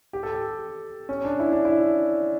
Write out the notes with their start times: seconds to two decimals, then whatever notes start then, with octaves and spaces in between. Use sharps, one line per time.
0.13 G4
0.23 A4
0.31 G4
1.09 C#4
1.25 D4
1.40 E4
1.53 D4
1.65 E4